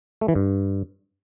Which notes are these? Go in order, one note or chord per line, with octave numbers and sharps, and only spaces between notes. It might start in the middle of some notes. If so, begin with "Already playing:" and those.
A3
E3
G2